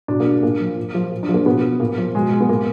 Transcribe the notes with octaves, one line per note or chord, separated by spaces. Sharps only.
B2 D4
A#3
A#2 A#3
F3
A#2
F3
A#2
D4
F3
A#3
B2 B3
A#2 A#3
F3
B2 G#3
B3
A#2 A#3